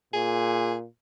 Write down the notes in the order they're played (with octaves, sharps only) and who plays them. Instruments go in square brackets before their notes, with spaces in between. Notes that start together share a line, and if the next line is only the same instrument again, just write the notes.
[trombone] A#2 [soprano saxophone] G#4